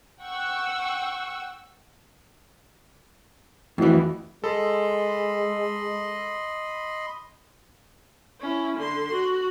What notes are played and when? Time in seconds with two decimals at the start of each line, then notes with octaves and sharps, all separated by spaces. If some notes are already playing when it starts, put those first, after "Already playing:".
0.22 F#5 G5 C#6 E6
3.78 F2 E3 A3 E4 F#4
4.44 G#3 A4 D#5 B5 C6
8.40 C#4 E4
8.78 D3 C6
9.12 F#4